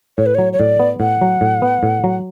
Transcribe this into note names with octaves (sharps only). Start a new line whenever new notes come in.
A2 C#5
B4
F#3 C#5
C#5
A2 D5
B3
A2 F#5
F#3
A2
B3
A2
F#3